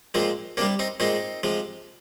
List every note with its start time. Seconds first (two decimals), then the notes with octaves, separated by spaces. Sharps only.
0.14 A#2 F3 G#3 C4
0.57 C3 A#3 D4
0.61 G3
0.79 C4 D#4
1.00 A#2 G#3 C4 D#4
1.43 C3 F3 G#3